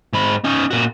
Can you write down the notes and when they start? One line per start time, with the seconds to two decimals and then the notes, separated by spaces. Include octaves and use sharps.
0.13 G#2 B5
0.44 C#4 D#4
0.71 A#2 F#4